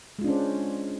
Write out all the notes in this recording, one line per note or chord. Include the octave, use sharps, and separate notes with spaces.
G#3 C#4 D4 F4 C5